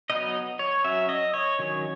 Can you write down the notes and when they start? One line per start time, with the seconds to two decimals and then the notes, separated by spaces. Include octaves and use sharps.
0.10 F#3 B3 D#4 D#5
0.59 C#5
0.84 F#3 C#4 E5
1.09 D#5
1.34 C#5
1.59 D#3 F#3 C#4